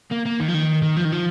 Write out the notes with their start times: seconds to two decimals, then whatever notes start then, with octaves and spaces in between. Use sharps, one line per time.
0.11 A#3
0.25 A#3
0.40 D#3
0.48 F3
0.54 D#3
0.83 D#3
0.97 F3
1.05 D#3
1.12 F3